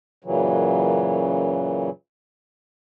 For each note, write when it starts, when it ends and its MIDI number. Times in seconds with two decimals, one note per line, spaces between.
0.24 1.90 42
0.24 1.90 46
0.24 1.90 49
0.24 1.90 52
0.24 1.90 54